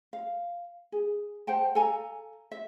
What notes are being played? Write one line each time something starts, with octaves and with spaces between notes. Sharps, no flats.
F5
G#4
C5 F#5 G5 A5
A4 F5 G#5 A#5
E5